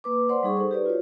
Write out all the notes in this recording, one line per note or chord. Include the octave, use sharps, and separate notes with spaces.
A#3 B4 D6
C5 D5 F#5 C6
G3 D#4 G#4 C#6
D#4 A4 C5
G4 B4 D5
F4 F#4 C#5